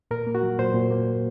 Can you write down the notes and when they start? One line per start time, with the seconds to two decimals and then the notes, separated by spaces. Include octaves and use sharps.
0.11 A#2 A#4
0.27 A#3
0.35 F#4
0.43 F#3
0.59 A#2 C5
0.74 A#2
0.91 A#3